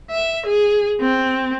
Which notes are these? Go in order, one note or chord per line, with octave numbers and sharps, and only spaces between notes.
E5
G#4
C4